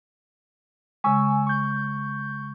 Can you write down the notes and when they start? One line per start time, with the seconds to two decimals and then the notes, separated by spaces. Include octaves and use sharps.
1.04 C#3 G#3 G#5 C#6 E6
1.47 C#6 G6